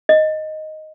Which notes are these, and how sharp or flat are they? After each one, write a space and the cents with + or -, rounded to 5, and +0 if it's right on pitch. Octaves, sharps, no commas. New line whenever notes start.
D#5 +0